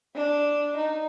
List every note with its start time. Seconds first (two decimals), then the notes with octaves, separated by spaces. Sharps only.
0.15 D4
0.78 D#4